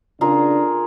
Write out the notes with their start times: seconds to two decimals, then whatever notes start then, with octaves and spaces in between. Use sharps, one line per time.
0.21 C#3 D4 F4 G#4 A#4